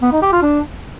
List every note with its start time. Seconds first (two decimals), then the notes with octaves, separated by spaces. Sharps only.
0.02 B3
0.12 D#4
0.22 G4
0.32 F4
0.42 D4